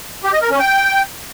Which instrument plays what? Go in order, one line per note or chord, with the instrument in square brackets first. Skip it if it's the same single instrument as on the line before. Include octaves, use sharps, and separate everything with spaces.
[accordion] G4
D#5
A#4
C#4
G5